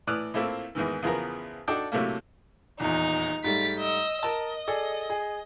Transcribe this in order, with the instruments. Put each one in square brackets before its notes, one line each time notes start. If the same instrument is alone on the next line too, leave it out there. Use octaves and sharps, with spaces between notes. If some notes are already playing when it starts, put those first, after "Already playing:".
[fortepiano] A2 E3 D5 D#6 F6 F#6
A2 A3 A#3 C4 E4 F4
E2 G#2 D#3 E3
E2 C#3 F3 B3 A#4
D4 D#4 F#4 A4 D5 G5
A2 C3 F#3 A3 A#3
[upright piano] D#1 E2 [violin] D#4
[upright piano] G#2 G3 A3 [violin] A6 B6
[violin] D#5 E6
[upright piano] A#4 A5 [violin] D#5
[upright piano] G#4 A4 D5
G#4